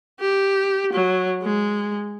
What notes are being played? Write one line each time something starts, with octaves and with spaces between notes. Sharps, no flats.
G4
F#3
G#3